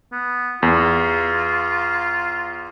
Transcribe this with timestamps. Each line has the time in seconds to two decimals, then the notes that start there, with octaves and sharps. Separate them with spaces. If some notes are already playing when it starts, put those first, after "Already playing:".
0.12 B3
0.63 E2 F4